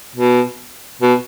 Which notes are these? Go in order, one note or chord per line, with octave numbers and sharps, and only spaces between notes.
B2
B2